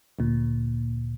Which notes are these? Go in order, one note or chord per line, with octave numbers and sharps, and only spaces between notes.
D2 A#2